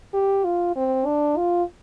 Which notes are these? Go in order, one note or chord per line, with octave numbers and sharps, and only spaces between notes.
G4
F4
C4
D4
F4